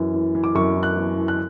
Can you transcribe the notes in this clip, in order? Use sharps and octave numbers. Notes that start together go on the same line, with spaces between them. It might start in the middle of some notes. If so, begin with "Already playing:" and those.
Already playing: F#2 E3
E3
E3
D6
F#2 C#6
E3
F#6
E3
E3
F#6